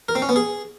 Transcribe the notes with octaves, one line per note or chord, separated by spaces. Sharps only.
A#4
C4
C#4
B3
G#4